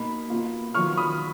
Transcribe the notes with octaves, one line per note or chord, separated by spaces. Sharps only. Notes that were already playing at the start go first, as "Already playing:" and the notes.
Already playing: B2 A#3 D#4 B5
B2 A#3 F4
D#3 F#3 B3 F4 C#6 F6
B5 D#6